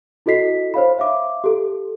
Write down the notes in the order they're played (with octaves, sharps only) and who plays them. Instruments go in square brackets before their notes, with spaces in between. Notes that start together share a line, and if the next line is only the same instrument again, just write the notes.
[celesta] E4 F#4 A4 D#5 B6 C7
C5 C#5 F5 B5
E5 F5 D6
G4 A4